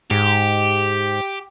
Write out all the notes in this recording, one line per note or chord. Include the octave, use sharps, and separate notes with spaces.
G#2 G4